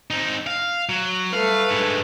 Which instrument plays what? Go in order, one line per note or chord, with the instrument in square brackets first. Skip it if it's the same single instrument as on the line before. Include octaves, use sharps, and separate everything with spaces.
[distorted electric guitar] C4 D#4
F5
F#3
[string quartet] G3 A3 B4 [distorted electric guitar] F5
[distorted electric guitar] G2 G#3